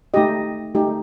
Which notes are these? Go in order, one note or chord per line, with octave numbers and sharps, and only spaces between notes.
A3 D#4 G4 D#5
A3 D#4 G4